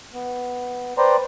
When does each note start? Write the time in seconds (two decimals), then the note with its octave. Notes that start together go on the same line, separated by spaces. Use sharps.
0.14 B3
0.98 B4 C5 D5 G5 A#5 C6